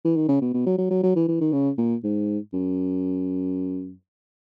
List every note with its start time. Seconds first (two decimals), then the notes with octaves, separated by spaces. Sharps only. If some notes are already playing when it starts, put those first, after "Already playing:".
0.05 E3
0.17 D#3
0.29 C#3
0.42 B2
0.54 B2
0.67 F#3
0.79 F#3
0.91 F#3
1.04 F#3
1.16 E3
1.29 E3
1.41 D#3
1.53 C#3
1.78 A#2
2.04 G#2
2.54 F#2